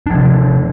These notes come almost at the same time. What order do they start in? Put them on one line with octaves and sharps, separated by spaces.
D4 F3 C3